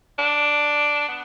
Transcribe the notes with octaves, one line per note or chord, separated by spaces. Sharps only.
D4
B3